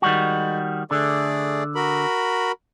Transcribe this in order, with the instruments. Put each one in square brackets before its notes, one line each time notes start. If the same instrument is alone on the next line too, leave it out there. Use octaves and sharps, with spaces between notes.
[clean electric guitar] D#3 G3 F#4 [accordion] G#3
[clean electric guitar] D3 [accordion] A3 G#4 D5
[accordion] F#4 A#4 B5